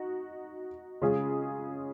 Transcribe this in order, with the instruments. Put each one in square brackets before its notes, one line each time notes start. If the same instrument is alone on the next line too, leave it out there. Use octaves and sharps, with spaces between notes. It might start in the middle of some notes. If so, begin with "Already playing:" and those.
Already playing: [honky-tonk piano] D#4 F#4
C#3 G#3 C#4 F4 G#4